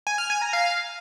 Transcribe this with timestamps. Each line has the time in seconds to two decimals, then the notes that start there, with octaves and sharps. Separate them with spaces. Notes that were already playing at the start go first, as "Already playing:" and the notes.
0.07 G#5
0.18 F6
0.30 G#5
0.42 A#5
0.53 F5